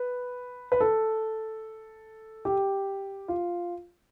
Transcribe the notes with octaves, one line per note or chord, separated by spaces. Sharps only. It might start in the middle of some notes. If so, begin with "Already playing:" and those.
Already playing: B4
B4
A4
G4
F4